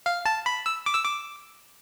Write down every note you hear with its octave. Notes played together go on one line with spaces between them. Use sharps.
F5
A5
B5
E6
D6
E6
D6